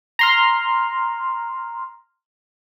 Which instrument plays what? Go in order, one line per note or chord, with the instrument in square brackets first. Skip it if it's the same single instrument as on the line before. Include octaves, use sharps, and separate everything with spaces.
[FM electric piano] A#5 C6 F6